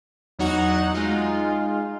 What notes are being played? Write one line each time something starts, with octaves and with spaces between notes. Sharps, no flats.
E2 F#3 D#4 F#4 F#5
G#3 D#4 F4